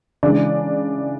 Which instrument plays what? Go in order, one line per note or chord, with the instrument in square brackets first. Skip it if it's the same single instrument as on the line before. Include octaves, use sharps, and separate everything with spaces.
[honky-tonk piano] C#3 E3 G#3 D4 D5